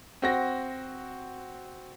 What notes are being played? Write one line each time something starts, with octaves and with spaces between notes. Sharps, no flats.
C4 F#4 A#6